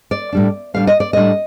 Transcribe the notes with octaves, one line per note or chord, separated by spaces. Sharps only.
D5
A2 G3 D4
A2 G3 D4 F5
D#5
D5
A2 G3 D4 D#5